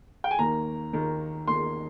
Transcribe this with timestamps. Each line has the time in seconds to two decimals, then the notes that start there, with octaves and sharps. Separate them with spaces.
0.24 G5
0.31 G#5
0.39 D#2 D#3 A#3 A#5
0.93 D#2 D#3 A#3
1.47 D#2 D#3 A#3 C6